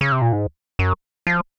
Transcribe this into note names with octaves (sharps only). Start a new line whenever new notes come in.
C#3
C3
A#2
G#2
F#2
F3